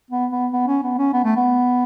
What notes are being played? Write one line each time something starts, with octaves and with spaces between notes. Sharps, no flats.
B3
B3
B3
C#4
B3
C#4
B3
A3
B3